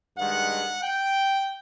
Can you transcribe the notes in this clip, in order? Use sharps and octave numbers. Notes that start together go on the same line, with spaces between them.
G2 D#3 G#3 F#5
G5